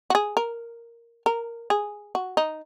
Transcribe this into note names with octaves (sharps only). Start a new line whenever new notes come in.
F#4
G#4
A#4
A#4
G#4
F#4
D#4